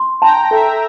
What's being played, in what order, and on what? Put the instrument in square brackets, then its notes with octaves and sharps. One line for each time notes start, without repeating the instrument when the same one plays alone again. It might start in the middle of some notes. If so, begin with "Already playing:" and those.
Already playing: [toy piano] C6
[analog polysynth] G5 A#5 [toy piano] A5
[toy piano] A4 [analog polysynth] E5 G5